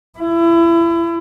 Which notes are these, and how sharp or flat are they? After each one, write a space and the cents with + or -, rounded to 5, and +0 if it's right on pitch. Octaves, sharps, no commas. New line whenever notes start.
E4 +30